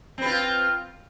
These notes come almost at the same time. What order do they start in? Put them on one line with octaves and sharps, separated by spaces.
C4 B4 F4